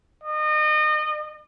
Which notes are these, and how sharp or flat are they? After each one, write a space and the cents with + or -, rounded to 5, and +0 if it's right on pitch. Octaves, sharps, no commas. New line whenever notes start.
D#5 -30